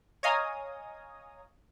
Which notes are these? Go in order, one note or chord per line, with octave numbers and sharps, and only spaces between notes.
C#5 D#5 F5 G#5 A#5 D#6